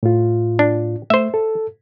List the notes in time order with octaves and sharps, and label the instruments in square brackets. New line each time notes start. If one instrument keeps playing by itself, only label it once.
[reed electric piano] A2 F4
[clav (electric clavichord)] D4
[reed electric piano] A3 [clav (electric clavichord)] C5 E5
[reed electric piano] A4